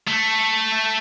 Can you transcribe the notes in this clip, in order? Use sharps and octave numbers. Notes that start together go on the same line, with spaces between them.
A3